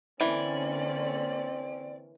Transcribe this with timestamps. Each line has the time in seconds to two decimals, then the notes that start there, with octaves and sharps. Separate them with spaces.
0.21 D3 E3 A#3 C4 C#4 D5